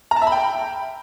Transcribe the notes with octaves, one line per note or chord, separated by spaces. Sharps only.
A#5
A5
E5
B5
G5